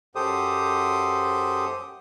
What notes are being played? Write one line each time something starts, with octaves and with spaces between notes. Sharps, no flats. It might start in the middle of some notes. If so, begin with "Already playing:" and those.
F#2 G4 A4 C5 D#6